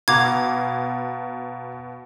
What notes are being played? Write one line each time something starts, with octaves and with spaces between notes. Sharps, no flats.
B2 F5 A#5 D6 G#6